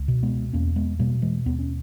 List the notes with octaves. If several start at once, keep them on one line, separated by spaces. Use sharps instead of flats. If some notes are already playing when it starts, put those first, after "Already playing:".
Already playing: C#2
B2
G#3 B3
E2 A#3 C#4
G#3 B3
B2 G3 A#3
E3 G#3
D#2 B3
C#4